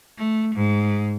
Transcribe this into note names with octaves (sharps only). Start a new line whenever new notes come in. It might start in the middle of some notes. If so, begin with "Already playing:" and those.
A3
G#2